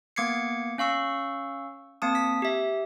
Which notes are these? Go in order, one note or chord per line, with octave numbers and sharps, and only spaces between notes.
A#3 B3 D6 G#6 C7 C#7
C#4 F5 C#6 E6
A#3 C4 A5 D#6
B6
G4 E5